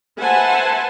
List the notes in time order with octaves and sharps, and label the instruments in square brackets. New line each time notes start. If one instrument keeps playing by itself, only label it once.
[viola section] B4 C5 E5 F#5 G#5 A5